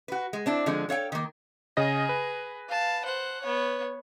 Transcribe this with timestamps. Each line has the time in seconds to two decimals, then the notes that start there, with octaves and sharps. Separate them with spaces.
0.08 F#4 B4
0.33 G#3
0.46 C4 D4 E4
0.66 D3 F3 G#3 C4
0.89 A4 C#5 F5 G5
1.12 D#3 A#3
1.77 C#3 G#4 D#5 A#6
2.09 B4
2.69 F5 A5
3.05 C5 F#5
3.42 B3 C#5